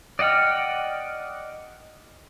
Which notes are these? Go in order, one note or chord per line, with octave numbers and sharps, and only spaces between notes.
D5 D#5 F#5 G5 F6